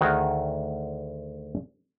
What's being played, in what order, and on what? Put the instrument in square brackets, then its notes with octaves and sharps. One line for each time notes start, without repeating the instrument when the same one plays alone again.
[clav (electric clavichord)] D2 D#3 F#4 G#4 G5